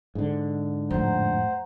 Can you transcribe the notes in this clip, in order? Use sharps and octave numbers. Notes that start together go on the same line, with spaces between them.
G#2 D3
F2 A2 C5 F#5 A#5